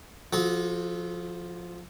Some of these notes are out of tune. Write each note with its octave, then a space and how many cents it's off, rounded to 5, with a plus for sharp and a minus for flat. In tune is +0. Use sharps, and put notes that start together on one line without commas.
F3 +0 F#4 -25 A4 -40